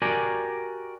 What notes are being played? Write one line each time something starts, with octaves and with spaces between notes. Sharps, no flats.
F#4 G4 A#4 D5 G#5